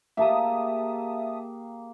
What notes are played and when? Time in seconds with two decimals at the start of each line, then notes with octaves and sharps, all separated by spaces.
0.17 A#3 G4 G#4 E5 A5 D#6